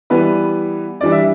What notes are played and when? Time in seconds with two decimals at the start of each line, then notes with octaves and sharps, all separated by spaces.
0.10 E3 G3 B3 B4
1.01 E3 G3 D4 D5
1.12 E5